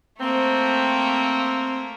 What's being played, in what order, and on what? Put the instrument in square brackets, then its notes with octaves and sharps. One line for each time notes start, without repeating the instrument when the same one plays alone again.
[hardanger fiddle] A3 A#3 [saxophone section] C4